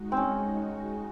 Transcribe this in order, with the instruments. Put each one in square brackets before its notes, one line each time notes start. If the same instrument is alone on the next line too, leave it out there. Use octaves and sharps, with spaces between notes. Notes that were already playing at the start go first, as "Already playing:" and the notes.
Already playing: [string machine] G#3 D#4 F#4
[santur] C4 C#4